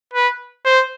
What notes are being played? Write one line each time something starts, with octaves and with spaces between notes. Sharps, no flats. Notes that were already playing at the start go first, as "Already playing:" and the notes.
B4
C5